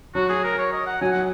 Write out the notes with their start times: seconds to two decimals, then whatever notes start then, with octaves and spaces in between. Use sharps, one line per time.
0.15 F#3 F#4
0.29 G#4
0.44 A#4
0.58 C#5
0.73 D#5
0.86 F#5
1.01 F#3 G#5
1.12 F#5